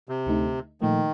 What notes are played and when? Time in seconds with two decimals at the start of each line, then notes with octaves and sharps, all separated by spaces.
0.09 C3
0.26 D2 D3 A3 D#4
0.81 A#2 D#3 F3 A3